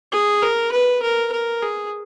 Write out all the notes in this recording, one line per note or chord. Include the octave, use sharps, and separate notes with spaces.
G#4
A#4
B4
A#4
A#4
G#4